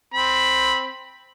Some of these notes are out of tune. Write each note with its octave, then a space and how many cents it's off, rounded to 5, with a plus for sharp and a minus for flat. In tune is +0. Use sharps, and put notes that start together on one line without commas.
C4 +0 B5 +0